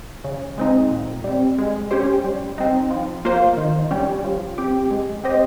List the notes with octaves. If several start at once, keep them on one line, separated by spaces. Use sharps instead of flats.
C#3
G#3 C4 D#4
A#2
G3 C4
G#3
C#4 G4 C5
G3
C4 D#4
F3
A#3 F4 C5
D#3
G3 C#4 G4
F3
C4 G4
G#3
C4 G4 C5 D#5